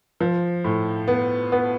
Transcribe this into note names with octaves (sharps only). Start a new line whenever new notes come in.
F3
A2
B3
B3